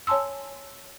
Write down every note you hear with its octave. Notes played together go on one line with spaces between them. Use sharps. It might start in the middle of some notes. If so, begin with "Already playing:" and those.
C#5 G#5 A5 C6 E6